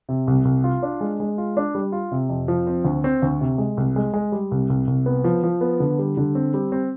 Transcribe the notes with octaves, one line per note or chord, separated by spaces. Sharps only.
C3
C2
C2
F4
D4
G#3
G#3
F4
D4
G3
F4
C3
F2
F3
C4
D2
C4
D2
C3
G#3
C2
G#3
G#3
G3
C2
C2
C2
B3
F3
F3
B3
D3
G3
D3
C4
G3
C4